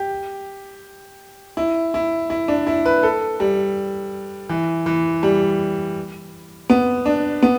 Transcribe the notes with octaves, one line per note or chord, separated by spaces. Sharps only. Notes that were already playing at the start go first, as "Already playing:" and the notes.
Already playing: G4
E4
E4
E4
D4
E4
B4
A4
G3
E3
E3
G3
B3
D4
B3